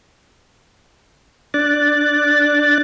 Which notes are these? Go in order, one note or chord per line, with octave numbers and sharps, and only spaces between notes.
D4 D5 F#6 A6